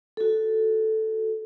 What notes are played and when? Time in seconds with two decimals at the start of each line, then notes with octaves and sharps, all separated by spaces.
0.17 F#4 A4